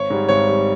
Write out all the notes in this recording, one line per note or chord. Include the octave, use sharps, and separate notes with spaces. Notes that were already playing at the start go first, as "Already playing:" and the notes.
Already playing: G#1 C#5
G#2 G3
G#1 C#5
G3